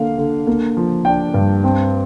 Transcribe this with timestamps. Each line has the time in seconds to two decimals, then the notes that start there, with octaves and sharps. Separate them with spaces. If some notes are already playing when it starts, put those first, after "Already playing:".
Already playing: D3 A#3 D4 F5
0.18 D3
0.47 A#3
0.77 F3
1.05 D4 G5
1.34 G2
1.64 C4